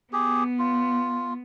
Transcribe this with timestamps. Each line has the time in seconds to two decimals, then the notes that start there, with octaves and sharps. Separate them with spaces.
0.13 B3 G4 G#4
0.59 F4